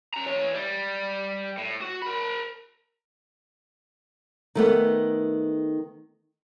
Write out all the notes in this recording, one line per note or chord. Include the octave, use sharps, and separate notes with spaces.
C#4 A#5
E3 C#5
G3
A2
F#4
A#4 B5
D#3 A3 B3